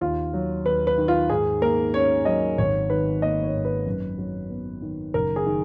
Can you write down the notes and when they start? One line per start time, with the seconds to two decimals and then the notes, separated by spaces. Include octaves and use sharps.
0.01 D#2 F4
0.33 F#3
0.66 D#2 B4
0.87 B4
0.98 D#3
1.08 F4
1.29 G#2 G#4
1.62 A#3 A#4
1.94 C#4 C#5
2.25 F#3 D#5
2.58 G#1 C#5
2.90 D#3 B4
3.22 A#3 D#5
3.43 C#5
3.54 G#2
3.65 B4
3.86 F#2
4.18 F#3
4.50 B3
4.82 D#3
5.14 F#1 A#4
5.36 G#4
5.46 D#3